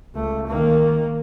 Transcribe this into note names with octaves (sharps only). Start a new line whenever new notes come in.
C#2 A3
D#3 A#3